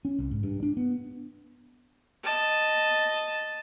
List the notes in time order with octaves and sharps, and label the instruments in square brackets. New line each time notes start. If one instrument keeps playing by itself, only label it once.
[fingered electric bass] C#4
C2
G#2
G2
D4
B3
[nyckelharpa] D#5 A5